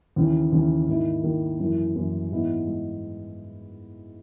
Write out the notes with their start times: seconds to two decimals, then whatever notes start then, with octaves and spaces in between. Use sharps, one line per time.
0.16 D#2 C#3 E3
0.52 D#2 C#3 E3
0.88 G#2 D#3 A#3 E4
1.24 G#2 D#3 A#3 E4
1.60 F#2 E3 A#3 C#4 E4
1.96 F#2 E3 A#3 C#4 E4
2.31 G#2 E3 G#3 B3 E4
2.67 G#3